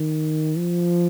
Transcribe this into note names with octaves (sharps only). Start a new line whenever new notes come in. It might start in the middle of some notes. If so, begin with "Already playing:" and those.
Already playing: D#3
F3